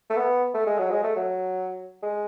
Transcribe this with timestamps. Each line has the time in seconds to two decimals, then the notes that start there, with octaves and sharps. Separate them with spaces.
0.10 A3
0.17 B3
0.54 A3
0.67 G#3
0.79 F#3
0.91 G#3
1.04 A3
1.16 F#3
2.03 G#3